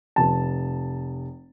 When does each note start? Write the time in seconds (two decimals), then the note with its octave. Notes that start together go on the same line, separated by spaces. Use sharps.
0.16 F1 A5